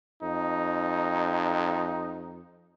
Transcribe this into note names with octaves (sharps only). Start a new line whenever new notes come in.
F2 D#4